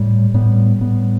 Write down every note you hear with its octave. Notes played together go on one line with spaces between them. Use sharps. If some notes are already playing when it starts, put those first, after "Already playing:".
Already playing: A2 G3
A2 G3 B3
A2 G3 B3